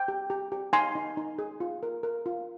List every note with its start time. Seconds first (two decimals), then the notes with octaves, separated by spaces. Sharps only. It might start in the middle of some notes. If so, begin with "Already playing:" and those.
Already playing: G5
0.08 G4
0.30 G4
0.52 G4
0.73 D#4 G#5 C6
0.95 D#4
1.17 D#4
1.38 G#4
1.60 F4
1.83 A#4
2.03 A#4
2.26 F4